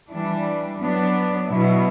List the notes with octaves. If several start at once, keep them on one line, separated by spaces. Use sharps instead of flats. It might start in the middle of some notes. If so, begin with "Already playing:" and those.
E3 G3 D4
F#3 B3 D4
B2 F#3 B3 E4